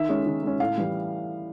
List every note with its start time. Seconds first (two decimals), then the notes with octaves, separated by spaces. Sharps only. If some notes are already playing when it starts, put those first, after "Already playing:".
Already playing: D#3 E5
0.09 G#3 C#4
0.26 D#3
0.43 G#3 C#4
0.60 A2 F5
0.77 E3 G3